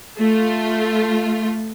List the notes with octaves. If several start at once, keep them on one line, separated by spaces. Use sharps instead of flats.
A3 F4